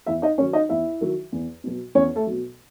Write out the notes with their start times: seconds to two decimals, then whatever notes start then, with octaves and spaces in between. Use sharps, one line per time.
0.06 E2 E4 E5
0.22 D#4 D#5
0.38 D#3 F#3 C#4 C#5
0.53 D#4 D#5
0.69 E2 E4 E5
1.01 D#3 F#3
1.32 E2
1.64 B2 F#3
1.95 E2 C#4 C#5
2.16 A3 A4
2.27 B2 F#3